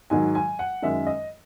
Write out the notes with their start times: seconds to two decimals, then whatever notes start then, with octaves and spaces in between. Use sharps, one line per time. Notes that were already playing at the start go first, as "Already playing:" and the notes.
0.10 G#2 D#3 F#3 G#5
0.35 G#5
0.59 F#5
0.82 F#2 D#3 G#3 E5
1.07 D#5